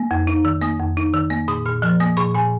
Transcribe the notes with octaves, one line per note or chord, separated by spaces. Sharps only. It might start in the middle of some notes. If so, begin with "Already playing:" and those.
Already playing: A#3
F2
D#4
D#3
A#3 D#6
F2
D#4
D#3
A#3
A#2 D#6
A#2 F6
F3 F6
A#3 D#6
A#2 C#6
A#2 G#5